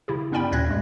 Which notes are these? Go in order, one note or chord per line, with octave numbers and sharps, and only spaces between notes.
C#3 E4 G4
G2 B3 C#4 D5 G5 B5
D#2 A#2 F#6 G#6 A#6
G2 G#3